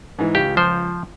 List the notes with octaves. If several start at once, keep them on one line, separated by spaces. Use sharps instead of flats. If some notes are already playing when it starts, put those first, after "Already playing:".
G#2 E3
C#2 G4
F3 C5